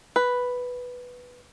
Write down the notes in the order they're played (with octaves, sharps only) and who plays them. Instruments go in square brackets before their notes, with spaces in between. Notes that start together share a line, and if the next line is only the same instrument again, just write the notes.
[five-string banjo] B4